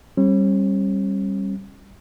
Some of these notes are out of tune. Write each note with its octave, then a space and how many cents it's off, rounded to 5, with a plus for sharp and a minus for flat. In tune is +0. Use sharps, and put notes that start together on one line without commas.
G3 +0 C#4 -45